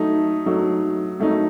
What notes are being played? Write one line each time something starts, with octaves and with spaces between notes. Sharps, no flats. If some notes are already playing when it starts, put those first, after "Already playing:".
Already playing: F#3 A3 D#4
F#3 A3 D#4
F#3 A3 D#4